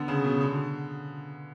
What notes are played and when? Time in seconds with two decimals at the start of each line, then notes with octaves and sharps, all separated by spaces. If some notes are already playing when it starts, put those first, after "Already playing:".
Already playing: D3 B3
0.08 C#3
0.24 B2
0.41 D3